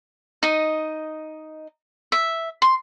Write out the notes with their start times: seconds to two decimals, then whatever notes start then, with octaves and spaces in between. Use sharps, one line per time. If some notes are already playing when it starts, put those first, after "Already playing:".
0.43 D#4 D#5
2.12 E5
2.62 C6